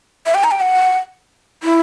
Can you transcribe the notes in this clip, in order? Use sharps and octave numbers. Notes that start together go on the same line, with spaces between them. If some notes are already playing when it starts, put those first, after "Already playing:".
E5
G5
A#5
G5
F#5
E4